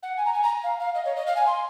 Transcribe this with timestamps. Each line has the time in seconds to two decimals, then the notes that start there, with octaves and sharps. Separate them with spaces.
0.03 F#5
0.17 G#5
0.25 A#5
0.34 G#5
0.43 A#5
0.63 F5
0.79 F5
0.95 D#5
1.05 C#5
1.16 D#5
1.27 F5
1.36 G#5
1.46 C6